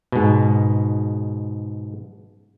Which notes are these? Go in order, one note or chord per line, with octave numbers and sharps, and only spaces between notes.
G#2 B2